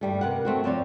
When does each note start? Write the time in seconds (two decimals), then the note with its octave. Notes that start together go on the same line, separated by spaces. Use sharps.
0.01 G2 G3 A3
0.21 C3 A#4 B4 F#5
0.45 A3 C4 F#4
0.64 F2 C4 C#5 D5